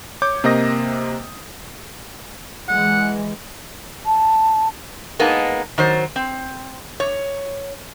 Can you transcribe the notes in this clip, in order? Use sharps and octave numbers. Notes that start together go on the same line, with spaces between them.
C#5 D6 G6
C3 A#3 C5 D#5 D#6 A#6
E3 G#3 F#5
A5
G#3 A#3 B3 D#4 A5
D#3 F#3 C5
C4
C#5